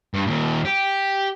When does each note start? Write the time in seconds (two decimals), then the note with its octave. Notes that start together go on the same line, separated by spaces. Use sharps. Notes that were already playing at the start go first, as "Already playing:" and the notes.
0.14 G2
0.26 D#2 A#2
0.65 G4